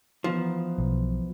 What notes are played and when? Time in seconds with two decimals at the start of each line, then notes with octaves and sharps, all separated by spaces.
0.24 E3 F3 B3 D#4
0.78 B1